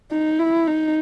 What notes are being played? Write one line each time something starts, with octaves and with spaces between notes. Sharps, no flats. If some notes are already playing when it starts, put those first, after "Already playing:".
D#4
E4
D#4